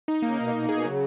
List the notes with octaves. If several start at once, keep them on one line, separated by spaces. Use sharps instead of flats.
D#4
C#3 A#3
B2 A#3
B2 A#3
B2 G#4
C#3 F#3